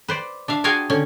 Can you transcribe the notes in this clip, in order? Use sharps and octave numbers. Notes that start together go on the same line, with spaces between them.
B4 C5 D5
D4 E5 F5
F4 F#4 G#4 F5 G5 G#5
D3 C#4